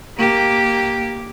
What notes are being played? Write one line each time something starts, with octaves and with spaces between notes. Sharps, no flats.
A#3 G4